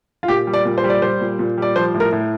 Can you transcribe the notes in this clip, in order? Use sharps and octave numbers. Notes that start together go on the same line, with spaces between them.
F4
A#2 G4
G3
D5
A#2
C5
G3
D5
G3 C5
A#2
A#2
G3 D5
F3 C5
A2
A#4
A2